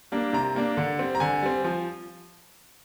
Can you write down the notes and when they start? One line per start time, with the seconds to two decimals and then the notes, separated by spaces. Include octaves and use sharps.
0.12 G3 A#3 D4
0.33 C3 A#5
0.55 G3 A#3 D4
0.77 D3
0.99 G3 C4
1.15 A#5
1.20 D3 G#5
1.43 G3 C4
1.64 F3